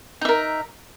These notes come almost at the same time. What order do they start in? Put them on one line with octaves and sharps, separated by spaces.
D#4 E5 A#4